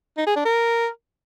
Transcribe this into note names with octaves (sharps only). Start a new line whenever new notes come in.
D#4
G#4
D4
A#4